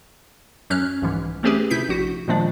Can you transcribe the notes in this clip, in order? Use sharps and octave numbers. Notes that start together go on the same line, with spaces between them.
F#2 F#3 C#4 F6 F#6
C2 G#2 E3
A3 C4 C#4 G4 G#4 B4
C3 E4 G6 B6
A#1 F#4
A#2 D#3 F3 G#3 D4